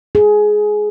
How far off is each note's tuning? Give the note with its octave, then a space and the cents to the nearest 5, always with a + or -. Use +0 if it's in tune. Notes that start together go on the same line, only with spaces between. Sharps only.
G#4 +15